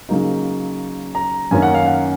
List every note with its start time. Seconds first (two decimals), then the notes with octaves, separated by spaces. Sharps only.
0.09 C#3 F#3 A#3 D#4
1.15 A#5
1.51 F#2 D#3 A#3 C#4 G#5
1.62 F#5
1.74 F5
1.87 F#5